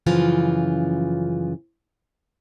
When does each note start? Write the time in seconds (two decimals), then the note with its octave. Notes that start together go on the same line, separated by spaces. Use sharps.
0.06 F#2 C#3 E3 F3 F4